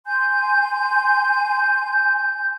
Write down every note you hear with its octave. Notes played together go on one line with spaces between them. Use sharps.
G#5 C6 G6